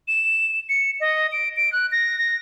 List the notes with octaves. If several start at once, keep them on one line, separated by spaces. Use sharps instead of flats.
E7
C#7
D#5
D7
D7
F#6
A#6
A#6